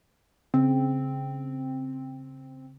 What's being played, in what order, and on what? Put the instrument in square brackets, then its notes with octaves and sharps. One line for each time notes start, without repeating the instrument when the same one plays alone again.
[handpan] C#3 [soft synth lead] C4